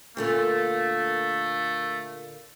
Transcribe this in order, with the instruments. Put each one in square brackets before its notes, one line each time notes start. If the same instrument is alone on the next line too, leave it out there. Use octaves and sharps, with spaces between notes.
[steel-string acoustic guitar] A#2 D3 A#3 [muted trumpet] A3